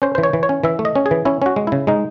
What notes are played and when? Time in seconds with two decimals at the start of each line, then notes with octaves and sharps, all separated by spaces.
0.02 C#4 C5
0.15 C5
0.18 E3
0.23 C#5
0.33 E3
0.43 C#5
0.49 C#4
0.64 E3 E5
0.79 A3
0.85 D#5
0.95 C#4
1.06 G#4
1.11 E3
1.25 C#4 E4
1.42 C#4 F#4
1.56 G#3
1.67 C#3 E4
1.87 G#3 D#4